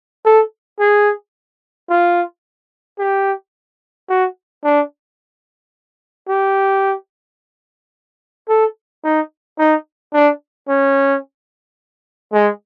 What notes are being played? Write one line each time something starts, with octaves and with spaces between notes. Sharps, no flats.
A4
G#4
F4
G4
F#4
D4
G4
A4
D#4
D#4
D4
C#4
G#3